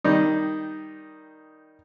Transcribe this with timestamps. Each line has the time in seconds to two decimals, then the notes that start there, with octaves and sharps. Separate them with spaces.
0.04 D#3 G3 D#4